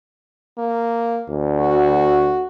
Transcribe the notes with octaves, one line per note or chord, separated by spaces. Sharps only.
A#3
D2
F#4